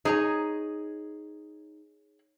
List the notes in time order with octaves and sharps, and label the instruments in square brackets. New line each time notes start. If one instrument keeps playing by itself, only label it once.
[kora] D#4 [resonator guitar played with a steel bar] G#4 C#5 A#5